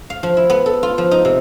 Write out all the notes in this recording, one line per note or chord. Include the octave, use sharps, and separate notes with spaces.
F5
F3
E4
B3
A4
F4
F3
D#4
C3